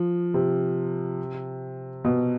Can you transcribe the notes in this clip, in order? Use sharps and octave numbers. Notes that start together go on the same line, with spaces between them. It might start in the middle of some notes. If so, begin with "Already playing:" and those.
Already playing: F3
C3
B2